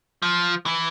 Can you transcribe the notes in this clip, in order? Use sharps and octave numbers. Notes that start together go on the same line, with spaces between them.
F3
E3